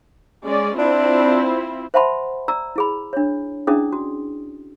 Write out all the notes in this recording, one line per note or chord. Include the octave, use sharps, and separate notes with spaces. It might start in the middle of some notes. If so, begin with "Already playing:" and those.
G#3 C#4 D5
C4 D4 E4 F4
C5 E5 F#5 A5 B5 C6
D5 A#5 E6
E4 G#4 B5
D4 C#5
C#4 D4 E4 G#4 D5 D#6
F#4